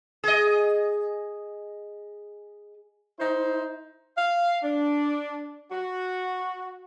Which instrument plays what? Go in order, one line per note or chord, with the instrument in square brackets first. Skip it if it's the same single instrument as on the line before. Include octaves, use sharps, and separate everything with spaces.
[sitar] G#4 D#5
[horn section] D#4 E4 C5
F5
D4
F#4